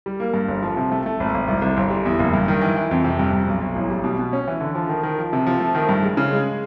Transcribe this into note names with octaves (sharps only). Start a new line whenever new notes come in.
G3
A#3
G2
G1
F3
C3
A3
A3
G#1
G#1
C2
C2
G1
G3
E2
F#1
G2
D#3
E3
E3
F2
C3
G2
G2
B1
B1
A1
G3
B2
B2
C#4
E3
D3
F3
D#3
D#3
F3
C3
F3
A3
D#3
G2
G#3
C#3
G#3